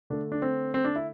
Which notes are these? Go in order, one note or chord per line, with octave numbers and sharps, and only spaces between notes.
D3 A3 D4
D4
C4
C4
D4
E4